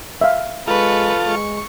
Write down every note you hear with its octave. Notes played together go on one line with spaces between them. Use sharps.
E5 F5
G#3 F4 A4 B4 C#6
G#3 C#6